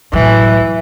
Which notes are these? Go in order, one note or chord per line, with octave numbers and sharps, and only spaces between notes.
A2 E3 F#3